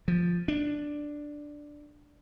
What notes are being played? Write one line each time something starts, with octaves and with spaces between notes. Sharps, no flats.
F3
D4